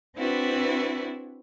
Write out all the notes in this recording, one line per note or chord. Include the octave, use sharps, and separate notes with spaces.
C4 D4 E4 F#4 B4